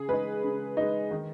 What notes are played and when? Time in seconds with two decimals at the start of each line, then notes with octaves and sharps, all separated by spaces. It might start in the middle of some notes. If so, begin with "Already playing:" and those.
Already playing: C#3 G#4
0.09 G#3 D#4 B4
0.43 C#3
0.77 G#3 D#4
1.11 D#3